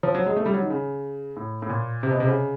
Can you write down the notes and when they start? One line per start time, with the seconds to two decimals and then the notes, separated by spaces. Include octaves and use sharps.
0.03 F3
0.15 F#3
0.26 G#3
0.36 A3
0.46 G3
0.53 F#3
0.62 D#3
0.70 C#3
1.37 A2
1.62 A2
1.69 A#2
2.03 C3
2.11 B2
2.20 C3
2.28 C#3